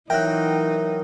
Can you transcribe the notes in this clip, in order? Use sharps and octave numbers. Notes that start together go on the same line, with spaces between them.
E3 F#3 D#4 A#4 E5 G5 F#6